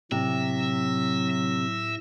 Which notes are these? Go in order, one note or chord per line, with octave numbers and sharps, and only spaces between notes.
A2 C3 F#3 E5 A#6